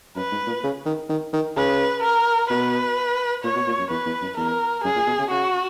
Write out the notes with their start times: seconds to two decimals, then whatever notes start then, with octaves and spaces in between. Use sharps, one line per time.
0.16 F#2 B4
0.32 G#2
0.47 A#2
0.63 C#3
0.86 D#3
1.09 D#3
1.33 D#3
1.57 C#3 B4
2.03 A#4
2.50 B2 B4
3.44 A#2 C#5
3.55 B2
3.67 A#2
3.79 F#2
3.90 E2 B4
4.06 E2
4.22 F#2
4.37 E2 A#4
4.84 F#2 G#4
4.96 A#2
5.07 B2
5.19 C#3
5.30 C#3 F#4